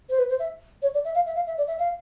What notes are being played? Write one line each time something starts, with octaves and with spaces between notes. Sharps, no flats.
C5
B4
C5
E5
C#5
D5
E5
F5
E5
F5
E5
D5
E5
F5